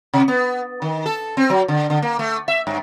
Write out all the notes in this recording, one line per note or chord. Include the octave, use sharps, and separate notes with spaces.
C3
B3
D#3
A4
C4
F#3
D3
D3
A#3
A3
E5
G2